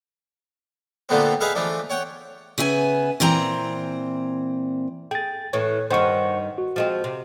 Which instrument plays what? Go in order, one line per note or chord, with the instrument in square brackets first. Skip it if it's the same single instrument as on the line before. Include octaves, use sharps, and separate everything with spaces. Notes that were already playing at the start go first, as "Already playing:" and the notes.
[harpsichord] A#2 D3 F3 A3 B3 C4
D#4 G#4 B4 E5 F5
E3 F3 A3 D4
C#5 F#5 G5
[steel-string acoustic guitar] C#3 B3 E5 G#5
A#2 E3 C4 G#5 A#5
[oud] G#4 [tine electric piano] G5 A6
[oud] A2 E3 [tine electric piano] C#5
[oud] G2 D#3 [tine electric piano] C5 F#5 C#6
[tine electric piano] F#4
[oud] F3 G#3 C4
C3